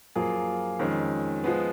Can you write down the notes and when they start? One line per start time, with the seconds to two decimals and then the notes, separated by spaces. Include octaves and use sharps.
0.16 F#2 F3 A#3 F4 G#4
0.79 F2 D#3 G#3 C#4
1.44 F3 G#3 B3